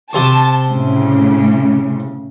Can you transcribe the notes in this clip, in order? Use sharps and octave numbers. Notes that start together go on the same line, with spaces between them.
C3 C4 A5 C#6
A2 C#3